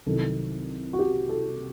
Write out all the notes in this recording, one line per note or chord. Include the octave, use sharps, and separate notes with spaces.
C2 C3 D#3 F#3 A4
F#4
G4
A4